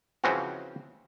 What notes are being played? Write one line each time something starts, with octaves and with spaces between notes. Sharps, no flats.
C#3 E3 F3 C4 C#4 F#4